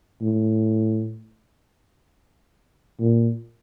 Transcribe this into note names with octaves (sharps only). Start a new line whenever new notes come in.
A2
A#2